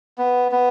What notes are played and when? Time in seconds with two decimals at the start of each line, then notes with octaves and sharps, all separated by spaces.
0.18 B3
0.52 B3